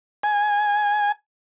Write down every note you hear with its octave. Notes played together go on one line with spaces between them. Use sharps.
G#5